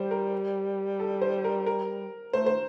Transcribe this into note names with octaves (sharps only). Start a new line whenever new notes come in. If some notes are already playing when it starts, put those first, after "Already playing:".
Already playing: G3 C5
A#4
A4
C5
A#4
A#4
A3 C5
C5